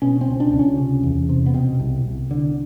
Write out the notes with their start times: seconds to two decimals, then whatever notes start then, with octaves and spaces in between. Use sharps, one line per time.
0.02 B2 C#4
0.21 C4
0.28 C#2
0.40 D4
0.53 C#2
0.59 C#4
0.78 C3
1.03 E2
1.29 C3
1.46 B3
1.54 B2 C4
1.80 C2
2.05 C2
2.31 D3